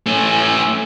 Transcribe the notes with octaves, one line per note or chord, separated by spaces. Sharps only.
A3 C#4